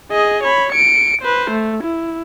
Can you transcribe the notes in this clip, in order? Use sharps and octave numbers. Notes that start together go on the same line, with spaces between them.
G#4 D#5
C#5 B5
C#7 D7
B4 C5
A3
E4